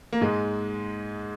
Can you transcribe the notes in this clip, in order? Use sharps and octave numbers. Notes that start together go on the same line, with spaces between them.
A#3
G#2 G#3